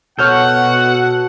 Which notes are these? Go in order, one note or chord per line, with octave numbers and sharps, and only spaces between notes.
B2 F#4 A4 C#5 F#5 F6 G6